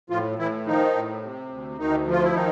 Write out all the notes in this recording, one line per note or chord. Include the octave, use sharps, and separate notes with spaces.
A2 F3 F4
A2 E3 E4
D#3 F3 D#4
A2
C3
D2
D2 D#3 D#4
F3 F4
E4
D#3 D#4